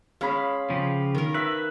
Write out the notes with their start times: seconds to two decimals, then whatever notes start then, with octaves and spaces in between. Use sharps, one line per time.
0.21 G#3 C#4 F5 B5
0.70 C#3 F3 G4
1.15 D#3 A#4
1.35 B4 E5